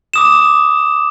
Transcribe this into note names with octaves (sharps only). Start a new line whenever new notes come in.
D6 D#6 E7